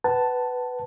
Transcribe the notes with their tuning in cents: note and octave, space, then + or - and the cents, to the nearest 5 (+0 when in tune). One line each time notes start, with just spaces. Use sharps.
B4 +10 F#5 +35 A5 +0